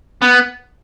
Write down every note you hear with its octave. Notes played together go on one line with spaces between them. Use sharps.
B3